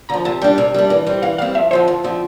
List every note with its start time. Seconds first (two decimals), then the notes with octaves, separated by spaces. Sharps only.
0.09 D3 F3 A#5
0.25 C3 A5
0.41 G3 D4 G5
0.58 C3
0.74 G3 D4
0.90 E3
1.07 G3 C4
1.22 E3 F5
1.38 G3 C4 F5
1.55 F2 E5
1.71 D3 F3 C4 C5
1.88 F2
2.03 D3 F3 C4